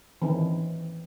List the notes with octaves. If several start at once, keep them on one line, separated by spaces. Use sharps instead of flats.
D#3 E3 C4 C#4